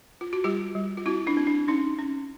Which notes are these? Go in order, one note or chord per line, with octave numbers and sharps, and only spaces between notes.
F4
F#4
G3 F4 G4
G3
F4
C4 E4 F#4
D4 E4
C4
D4
C#4 D#4
C#4